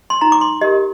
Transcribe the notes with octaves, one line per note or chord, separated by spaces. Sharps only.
C6
D#4 A#5
D6
C6
G4 A#4 D#5